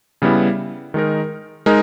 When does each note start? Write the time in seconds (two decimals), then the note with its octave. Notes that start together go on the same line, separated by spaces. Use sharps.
0.22 C#3 G3 B3 E4
0.94 D#3 G#3 D#4 A#4
1.66 G#3 D#4 A#4